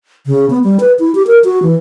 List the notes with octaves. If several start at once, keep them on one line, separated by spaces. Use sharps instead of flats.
C#3
B3
G3
B4
E4
G4
A#4
F#4
E3